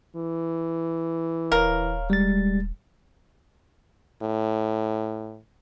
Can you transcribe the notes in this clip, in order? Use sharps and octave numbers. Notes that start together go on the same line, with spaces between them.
E3
D#1 A#4 C#5 F5
G3 G#3 A6
A2